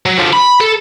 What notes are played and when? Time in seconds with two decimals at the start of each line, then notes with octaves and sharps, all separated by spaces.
0.06 F#3
0.18 D3 F3
0.33 B5
0.61 A4